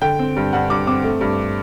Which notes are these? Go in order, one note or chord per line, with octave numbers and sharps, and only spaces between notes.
D3 G5
C4
G2
G2 F#5
G2 D6
C4 D6
A3
G2